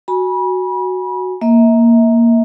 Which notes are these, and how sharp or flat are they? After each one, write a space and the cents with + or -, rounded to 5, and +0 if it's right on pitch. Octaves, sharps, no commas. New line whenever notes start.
F#4 +0 G#5 +0 B5 -30
A#3 +0 E5 -35